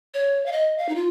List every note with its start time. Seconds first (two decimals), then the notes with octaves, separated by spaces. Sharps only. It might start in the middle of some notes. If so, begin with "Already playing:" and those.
0.14 C#5
0.46 F5
0.52 D#5
0.78 F5
0.89 D#4
0.96 F4